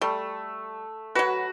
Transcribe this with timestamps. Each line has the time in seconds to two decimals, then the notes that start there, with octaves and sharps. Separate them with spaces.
0.01 G3 A3
1.15 F#3 F#4 B4